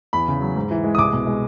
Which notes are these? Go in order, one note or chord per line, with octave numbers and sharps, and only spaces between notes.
E2 B5
C#3
F#3
G#2
E3
G#3
D#6
C2 D6
B2
G#3